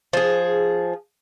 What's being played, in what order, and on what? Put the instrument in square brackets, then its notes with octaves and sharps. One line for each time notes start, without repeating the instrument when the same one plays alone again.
[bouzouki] F3 G#4